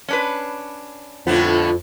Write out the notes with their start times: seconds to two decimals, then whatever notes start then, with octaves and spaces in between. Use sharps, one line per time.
0.08 C#4 D4 B4
1.27 F2 A2 D3 B3 F4